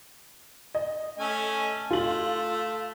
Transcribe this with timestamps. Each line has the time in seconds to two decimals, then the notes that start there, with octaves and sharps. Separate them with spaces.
0.75 D#5
1.18 A3 C#4 G#5
1.91 A3 F4 F#7